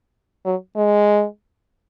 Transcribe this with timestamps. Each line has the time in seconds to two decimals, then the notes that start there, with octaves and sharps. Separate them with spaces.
0.45 F#3
0.76 G#3